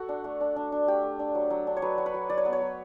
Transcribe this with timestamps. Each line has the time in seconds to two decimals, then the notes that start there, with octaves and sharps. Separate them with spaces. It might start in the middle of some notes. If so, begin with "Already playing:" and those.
Already playing: F#4 A4
0.09 D4
0.24 A3
0.41 D4
0.56 D4
0.72 D4
0.88 A3 G4
1.03 A3
1.19 D4
1.35 F#3
1.50 F#3
1.67 D4
1.77 C#5
1.82 F#3 B4
1.98 F#3
2.06 B4
2.14 F#3
2.30 F#3 D5
2.37 C#5
2.45 B3 B4
2.53 C#5
2.61 F#3